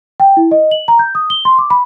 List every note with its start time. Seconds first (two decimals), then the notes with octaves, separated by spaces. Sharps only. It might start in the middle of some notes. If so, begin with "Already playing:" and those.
0.20 G5
0.37 E4
0.51 D#5
0.71 F#7
0.88 A#5
0.99 G6
1.15 D#6
1.30 G7
1.45 C6
1.59 D6
1.70 B5